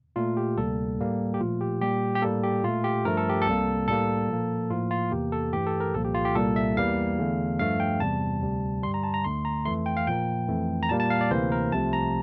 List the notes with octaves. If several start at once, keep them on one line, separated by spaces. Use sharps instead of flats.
A#2 A3 F4
G4
D2 C3 G3 A#3 A4
A2 G3 A#3
G4
A#2 F3 A3 F4
G4
A#2 G3 A#3 G4
G4
A2 G3 A#3 A4
G4
A#2 A3 F4
G4
G2 F3 A3 A#4
A4
G4
A4
C2 C3 G3 A#3
A2 G3 A#3 A4
A#2 F3 A#3
A2 F3 A#3 F4
F4
E2 C3 E3 A#3 G4
A4
G2 E3 A3 G4
A4
A#4
C2 A#2 F3 A#3 A4
G4
F4
G4
C2 A#2 G3 A#3 A4
E5
E2 E3 G3 A#3 F5
E2 D3 A3
G2 F3 A3 F5
G5
E2 C3 G3 A5
D2 C3 G3
G2 D3 G3 C6
A#5
A5
A#5
D2 D3 A3 C6
A#5
F2 E3 A3 C6
G5
F5
A#2 F3 A#3 G5
F2 E3 A3
A#5
A#2 G3 A#3 A5
A5
F5
D5
D2 C3 E3 A#3 C5
A#4
C2 C3 F3 A3 A5
A#5